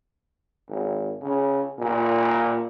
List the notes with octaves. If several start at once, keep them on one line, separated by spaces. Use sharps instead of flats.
G#1
C#3
A#2